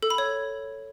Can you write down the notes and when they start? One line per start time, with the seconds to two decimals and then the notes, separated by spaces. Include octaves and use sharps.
0.03 A4
0.10 B5
0.18 C#5